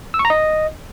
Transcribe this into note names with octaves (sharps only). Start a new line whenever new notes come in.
E6
C#6
A#5
D#5